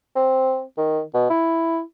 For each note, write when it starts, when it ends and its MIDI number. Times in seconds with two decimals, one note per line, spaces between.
0.16 0.62 60
0.78 1.01 51
1.14 1.30 47
1.30 1.81 64